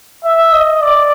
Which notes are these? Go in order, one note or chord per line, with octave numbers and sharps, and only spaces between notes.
E5
D#5
D5